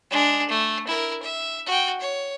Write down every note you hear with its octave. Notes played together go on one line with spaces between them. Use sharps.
G#3 D4
A3
E4 A#4
E5
F#4 G5
C#5